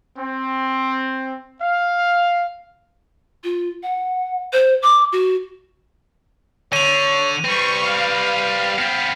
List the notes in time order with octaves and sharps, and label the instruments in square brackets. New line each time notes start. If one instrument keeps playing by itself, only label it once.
[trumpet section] C4
F5
[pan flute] F4
F#5
C5
D6
F#4
[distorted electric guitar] D3 [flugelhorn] C#5 [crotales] D#7 F7
[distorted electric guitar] G3 C4 [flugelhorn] B4 [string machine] C#6
[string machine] F5
[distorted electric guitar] B3 C4